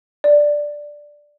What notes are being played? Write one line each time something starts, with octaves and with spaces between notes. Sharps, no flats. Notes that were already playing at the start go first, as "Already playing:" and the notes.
D5